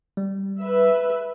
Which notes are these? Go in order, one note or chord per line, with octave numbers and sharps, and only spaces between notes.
G3
B4 E5